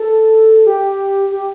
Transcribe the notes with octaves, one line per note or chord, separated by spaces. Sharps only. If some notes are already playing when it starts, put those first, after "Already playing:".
Already playing: A4
G4
G4